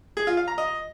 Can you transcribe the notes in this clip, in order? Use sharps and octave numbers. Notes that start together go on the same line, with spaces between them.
G#4
F4
F5
A#5
D#5